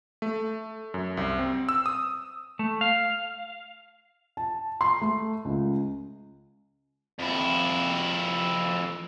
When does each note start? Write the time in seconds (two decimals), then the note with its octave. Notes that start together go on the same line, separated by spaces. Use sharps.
0.22 A3
0.94 F#2
1.17 C2
1.39 C4
1.69 E6
1.86 D#6
2.59 A3
2.81 F5
4.37 A5
4.81 C6
5.01 A3
5.45 C#2
7.19 F2 E4